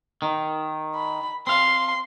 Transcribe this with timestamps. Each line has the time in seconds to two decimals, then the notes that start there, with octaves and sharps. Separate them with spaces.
0.22 D#3
0.95 B5
1.47 C4 F5 C6